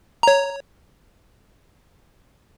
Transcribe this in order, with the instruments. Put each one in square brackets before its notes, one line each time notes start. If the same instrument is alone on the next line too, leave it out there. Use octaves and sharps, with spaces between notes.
[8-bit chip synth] C#5 A#5